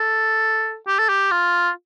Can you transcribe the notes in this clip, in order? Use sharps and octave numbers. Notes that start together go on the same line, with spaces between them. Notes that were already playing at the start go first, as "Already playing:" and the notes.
Already playing: A4
G4
A4
G4
F4